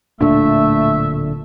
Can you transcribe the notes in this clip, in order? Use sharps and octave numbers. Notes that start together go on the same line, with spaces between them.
D1 A#2 D3 A3 D4 E5